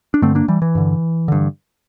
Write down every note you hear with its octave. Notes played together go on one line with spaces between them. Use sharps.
D4
G2 D3 A3 C4
A#3 D4
E3 G3
E3
G2 D3
G2 D3